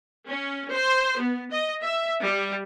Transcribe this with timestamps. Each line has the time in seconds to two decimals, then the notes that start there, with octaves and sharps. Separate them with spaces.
0.28 C#4
0.72 C5
1.18 B3
1.51 D#5
1.83 E5
2.23 G3